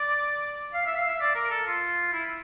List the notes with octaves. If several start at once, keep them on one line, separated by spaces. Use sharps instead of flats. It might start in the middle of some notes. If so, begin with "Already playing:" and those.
Already playing: D5
F5
E5
F5
E5
D5
A#4
A4
F4
E4